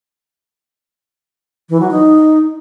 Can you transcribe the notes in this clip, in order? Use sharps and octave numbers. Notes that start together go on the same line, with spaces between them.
E3
F#3
D#4